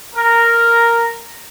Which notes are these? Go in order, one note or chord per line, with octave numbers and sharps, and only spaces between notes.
A#4